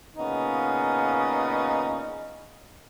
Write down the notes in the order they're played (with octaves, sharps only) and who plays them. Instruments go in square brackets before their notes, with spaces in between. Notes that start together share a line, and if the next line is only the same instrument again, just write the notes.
[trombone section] A#2 C#3 B3 [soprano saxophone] D#4